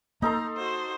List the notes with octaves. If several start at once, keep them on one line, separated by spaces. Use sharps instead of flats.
A#3 D#4 A4 A#5 C6
F#4 C5